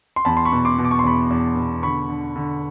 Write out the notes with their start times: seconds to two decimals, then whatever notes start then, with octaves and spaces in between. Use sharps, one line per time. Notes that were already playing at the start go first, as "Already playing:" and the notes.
0.16 C6
0.25 E2 A5 B5
0.37 C6
0.45 B5 C#6
0.52 B2
0.65 C6 D6
0.78 B2
0.85 D6
0.91 C#6
0.99 C6
1.04 E2 B5 C#6
1.30 E2
1.56 B2
1.83 D3 B5 C#6
2.09 D3
2.36 D3